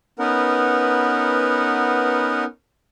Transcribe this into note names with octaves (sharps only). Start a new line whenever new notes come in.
B3 C#4 D#4 A#4 B4 F#5